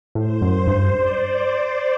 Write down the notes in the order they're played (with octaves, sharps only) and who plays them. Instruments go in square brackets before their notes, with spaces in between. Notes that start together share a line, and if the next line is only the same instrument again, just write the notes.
[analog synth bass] A2 [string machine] C5
[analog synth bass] F#2
G2
[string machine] D5